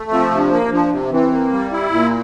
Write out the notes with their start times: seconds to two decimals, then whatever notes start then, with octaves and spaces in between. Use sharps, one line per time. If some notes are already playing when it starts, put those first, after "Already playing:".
Already playing: A3
0.11 F3 C4
0.31 C3 D4
0.51 A#3
0.71 F3 D4
0.92 C3
1.11 E3 C4
1.32 A#3
1.52 G3
1.72 E4
1.92 A#2 A#3